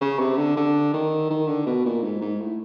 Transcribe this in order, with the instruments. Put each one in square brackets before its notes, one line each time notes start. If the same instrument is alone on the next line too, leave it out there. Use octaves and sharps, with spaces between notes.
[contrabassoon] C#3
C3
D3
D3
D#3
D#3
D3
B2
A#2
G#2
G#2
A2